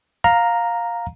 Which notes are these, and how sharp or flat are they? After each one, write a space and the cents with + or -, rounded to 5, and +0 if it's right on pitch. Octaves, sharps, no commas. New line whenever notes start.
F5 +10 A#5 +0